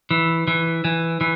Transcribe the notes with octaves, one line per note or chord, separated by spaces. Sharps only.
E3
E3
E3
E3